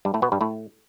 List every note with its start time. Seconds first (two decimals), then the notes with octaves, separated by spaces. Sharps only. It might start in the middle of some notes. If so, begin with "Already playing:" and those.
0.05 G2 G3
0.14 A2 A3
0.22 B2 B3
0.32 G2 G3
0.41 A2 A3